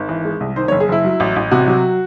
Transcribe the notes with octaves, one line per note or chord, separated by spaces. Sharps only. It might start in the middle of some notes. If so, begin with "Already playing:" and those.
Already playing: G#1
E3
G#3
C2
D#3 C5
C#5
F#1
G#4
F#1 E4
F#3
A1
A1
C3 F#4
F#3